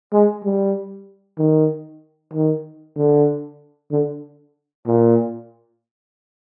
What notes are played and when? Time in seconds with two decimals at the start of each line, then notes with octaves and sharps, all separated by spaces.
0.13 G#3
0.45 G3
1.38 D#3
2.34 D#3
2.97 D3
3.91 D3
4.87 A#2